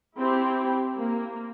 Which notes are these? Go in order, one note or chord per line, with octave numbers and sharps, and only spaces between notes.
C4 E4 G4
A#3